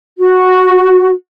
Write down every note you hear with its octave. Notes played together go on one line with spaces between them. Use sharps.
F#4